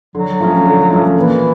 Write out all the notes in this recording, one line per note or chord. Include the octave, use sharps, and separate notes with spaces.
D3 F#3
F3 A3 C#4
D3
F3 A3 C#4
A#2 E3